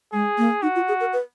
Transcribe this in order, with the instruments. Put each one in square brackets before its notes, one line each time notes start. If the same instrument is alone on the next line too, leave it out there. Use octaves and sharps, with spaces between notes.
[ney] G#3 [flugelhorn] G#4
[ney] A#3
[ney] D#4 [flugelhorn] F#4
[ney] F4
G#4
A#4
B4